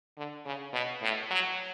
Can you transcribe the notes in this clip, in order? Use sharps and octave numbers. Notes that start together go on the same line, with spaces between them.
D3
C#3
B2
A2
F#3